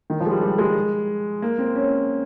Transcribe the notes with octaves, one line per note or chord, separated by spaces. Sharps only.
D#3
F3
G#3
G3
G3
G#3
A#3
C4
C#4